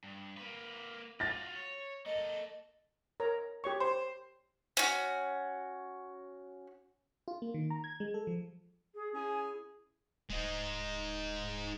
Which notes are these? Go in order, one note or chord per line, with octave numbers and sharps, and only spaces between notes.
G2
A#3 B4
F4 F#4 A6 A#6
C#5
A#3 A4 D#5
A#4 C#5 A#5
G4 C#5 C#6
C5
C#4 F#4
F4
A#3
D#3
A#5
G#6
G#3
A4
F3
G#4
C#4 E4 G#4 G#5
D1 G#3 D#4